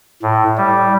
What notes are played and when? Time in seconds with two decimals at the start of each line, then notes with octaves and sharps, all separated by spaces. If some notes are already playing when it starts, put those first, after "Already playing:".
0.22 A2
0.57 G3